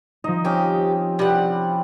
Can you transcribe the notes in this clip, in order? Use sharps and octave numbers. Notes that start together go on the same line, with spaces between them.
F3 D#4 D#5
C4 C#4 G4
C3 E3 G3 F#5